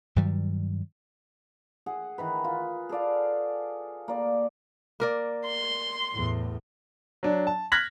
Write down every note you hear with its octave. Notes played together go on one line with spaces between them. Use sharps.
G2 D#3 F#3 G3
G#4 F#5
D#3 E3 B4
F4
G#4 A4 D5 F5
A#3 D5
A#3 A#4 D5
C6
E2 A2
F#3 D4
A5
F6 F#6 G#6 A#6 B6 F#7